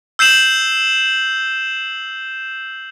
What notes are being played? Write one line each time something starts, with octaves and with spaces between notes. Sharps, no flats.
E6 G6 C7 E7 F#7